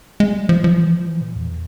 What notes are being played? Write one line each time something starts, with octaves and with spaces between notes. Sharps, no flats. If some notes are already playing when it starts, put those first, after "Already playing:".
G#3
G3
F3
F3
E3
F3
E3
A#2
E2